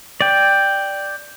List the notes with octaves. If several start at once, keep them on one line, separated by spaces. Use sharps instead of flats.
D5 G5